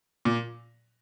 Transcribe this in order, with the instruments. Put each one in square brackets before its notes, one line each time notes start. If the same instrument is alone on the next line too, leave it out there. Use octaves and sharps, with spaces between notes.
[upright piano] A#2